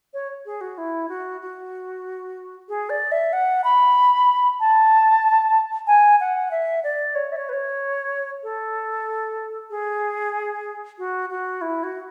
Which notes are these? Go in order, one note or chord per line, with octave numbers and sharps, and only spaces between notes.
C#5
G#4
F#4
E4
F#4
F#4
G#4
D5
E5
F#5
B5
A5
G#5
F#5
E5
D5
C#5
E5
C#5
B4
C#5
A4
G#4
F#4
F#4
E4
F#4